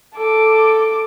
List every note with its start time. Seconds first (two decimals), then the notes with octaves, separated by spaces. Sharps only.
0.15 A4 D6